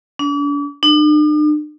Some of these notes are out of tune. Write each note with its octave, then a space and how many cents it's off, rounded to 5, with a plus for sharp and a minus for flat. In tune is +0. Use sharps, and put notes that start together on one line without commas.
D4 -40
D4 +45